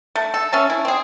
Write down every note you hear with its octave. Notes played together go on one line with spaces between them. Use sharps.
A3
A4
C#4 E5 A5
E4
C4 G#4